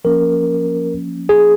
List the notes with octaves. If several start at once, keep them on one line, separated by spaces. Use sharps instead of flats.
F3 A#3 C#4 A#4
G#4